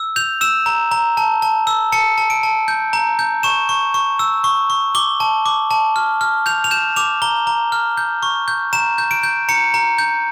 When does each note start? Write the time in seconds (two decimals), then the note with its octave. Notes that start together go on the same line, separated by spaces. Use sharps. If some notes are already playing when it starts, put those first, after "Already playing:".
Already playing: E6
0.16 G6 F7
0.41 E6 E7
0.66 A#5
0.91 A#5
1.17 A5
1.42 A5
1.67 E6
1.92 A5 C#7
2.18 A5
2.30 D7
2.43 A5
2.68 G6
2.93 A#5
3.19 G6
3.43 C#6 E7
3.69 C#6
3.94 C#6
4.19 E6
4.44 C#6
4.70 C#6
4.95 D6 G7
5.20 A5
5.46 D6
5.71 A5
5.96 F6
6.21 F6
6.46 G6 F7
6.64 F7
6.71 G6 E7
6.96 D6 F7
7.22 A#5 G7
7.47 A#5
7.72 F6
7.97 G6
8.23 C#6
8.48 G6
8.73 A#5 E7
8.98 G6
9.11 D7
9.23 G6
9.49 A#5 C#7
9.74 A#5
9.98 G6